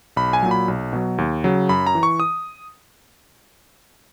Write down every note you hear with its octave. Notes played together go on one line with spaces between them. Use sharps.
B1 B5
G#5
A#2 F#3
B5
B1
B2 F#3
D#2
C#3 F#3
F#2 B5
A#5
E3
C#6
D#6